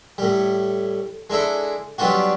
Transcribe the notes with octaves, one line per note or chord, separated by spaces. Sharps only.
A2 G3
G#3 D4 E4 A4
F#3 G3 B3 D4 F4 F#4